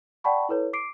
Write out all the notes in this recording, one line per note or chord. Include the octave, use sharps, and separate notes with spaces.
D5 F#5 G5 A5 B5 C#6
E4 A4 B4 C#5
D6 C7 D7